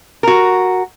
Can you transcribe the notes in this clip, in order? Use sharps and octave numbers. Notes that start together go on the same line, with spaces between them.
F#4 A#4